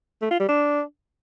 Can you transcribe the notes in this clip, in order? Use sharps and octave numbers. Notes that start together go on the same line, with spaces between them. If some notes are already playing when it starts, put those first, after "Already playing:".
A3
F4
G3
D4